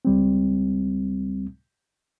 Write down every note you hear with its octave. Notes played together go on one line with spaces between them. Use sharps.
C#2 G3 C4